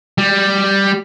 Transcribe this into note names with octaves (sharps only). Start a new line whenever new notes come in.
G3